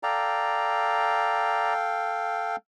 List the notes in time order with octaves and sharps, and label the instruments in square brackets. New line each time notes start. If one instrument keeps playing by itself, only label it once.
[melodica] A4 F5 G5 [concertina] D5 A#5